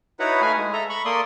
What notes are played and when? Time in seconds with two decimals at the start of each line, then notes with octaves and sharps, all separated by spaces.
0.20 D#4 E4 F#4 B4 C#5 F#5
0.42 A3 B4 F5 G#5
0.57 G#3
0.73 A4 E5 A#5
0.90 B5 C#6
1.05 A#3 A4 D5 C6 D#6